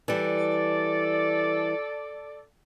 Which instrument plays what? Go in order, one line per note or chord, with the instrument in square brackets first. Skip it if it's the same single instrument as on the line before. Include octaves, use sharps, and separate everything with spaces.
[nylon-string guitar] E3 G3 [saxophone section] A4 D5